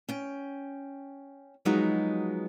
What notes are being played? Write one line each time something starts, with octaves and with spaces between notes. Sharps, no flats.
C#4 G5
F3 F#3 G#3 B3 D#4 F#4